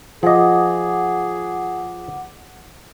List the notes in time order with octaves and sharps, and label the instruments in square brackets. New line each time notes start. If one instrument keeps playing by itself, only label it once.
[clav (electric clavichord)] F3 D#5 [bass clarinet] G#4 [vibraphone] F#5 D6